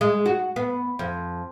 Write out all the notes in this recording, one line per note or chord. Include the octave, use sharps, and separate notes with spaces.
G#3
F#4
B3
F2